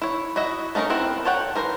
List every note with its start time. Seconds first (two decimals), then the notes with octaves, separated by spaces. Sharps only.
0.02 E4 C#5
0.36 E4 F#4 D#5 E5
0.75 A3 C#4 D#4 F4 A#4
0.90 B3 C4 E4 A#4
1.25 A4 C#5 F#5 G5
1.55 E3 A#4 C5